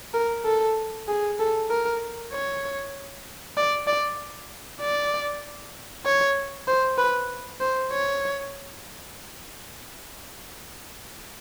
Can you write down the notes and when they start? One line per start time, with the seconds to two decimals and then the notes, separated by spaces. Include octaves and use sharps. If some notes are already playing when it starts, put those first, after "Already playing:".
0.14 A#4
0.45 A4
1.08 G#4
1.39 A4
1.70 A#4
2.33 C#5
3.57 D5
3.87 D5
4.81 D5
6.06 C#5
6.68 C5
6.98 B4
7.60 C5
7.92 C#5